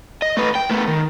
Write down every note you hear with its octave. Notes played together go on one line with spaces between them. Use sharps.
D#5
A3 B4
G5
A3 B3
D#3